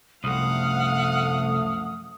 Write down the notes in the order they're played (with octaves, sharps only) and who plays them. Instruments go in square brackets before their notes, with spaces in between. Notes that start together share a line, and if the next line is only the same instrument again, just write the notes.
[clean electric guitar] C2 [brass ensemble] F#2 F3 A3 [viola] F5 F#5 [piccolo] D#6